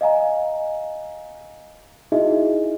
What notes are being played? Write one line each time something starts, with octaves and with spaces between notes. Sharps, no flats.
D#5 F5 G#5 A#5
D#4 E4 F#4 G#4 D#5 E5